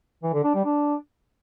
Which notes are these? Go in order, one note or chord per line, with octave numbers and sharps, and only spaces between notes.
E3
D3
D4
G3
D4